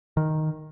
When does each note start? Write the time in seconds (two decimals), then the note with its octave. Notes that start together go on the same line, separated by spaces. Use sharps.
0.17 D#3